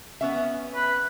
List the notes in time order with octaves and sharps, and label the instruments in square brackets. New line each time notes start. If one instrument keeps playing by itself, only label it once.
[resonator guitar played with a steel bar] B3 C#4 E5
[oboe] B4